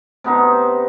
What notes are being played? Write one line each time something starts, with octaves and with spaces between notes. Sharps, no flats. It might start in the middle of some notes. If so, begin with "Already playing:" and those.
C3 B3 D#4 C5